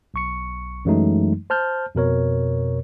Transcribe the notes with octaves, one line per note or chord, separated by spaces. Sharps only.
B1 C#6 C#7
F#2 E3 F#3 G#3 A3 D#4
C5 A5 F6 G6
F2 B2 A#4 C#5